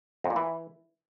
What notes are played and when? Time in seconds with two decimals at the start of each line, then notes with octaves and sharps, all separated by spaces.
0.24 F2
0.30 A#2
0.36 E3